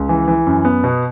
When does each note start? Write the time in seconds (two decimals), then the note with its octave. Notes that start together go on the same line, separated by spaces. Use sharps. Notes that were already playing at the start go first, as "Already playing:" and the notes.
Already playing: C#2
0.09 E3
0.28 E3
0.46 F#2
0.65 B3
0.84 B2